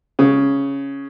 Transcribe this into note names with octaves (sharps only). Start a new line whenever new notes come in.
C#3